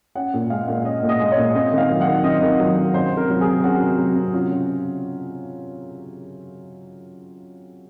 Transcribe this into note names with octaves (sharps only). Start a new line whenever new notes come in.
C#4 F#5
A#2
G#3 F5
A#2
C#4 D#5
A#2
D#5
G#3
C#5
A#2
C4 D#5
D#3
F5
F#3
F#5
D#3
C4 D#5
D#3
F#3
D#3
C#4 C5
C3
A#4
F#3
G#4
C3
C#4 F#4
C3
F#3
C3
C#4 F4
C#3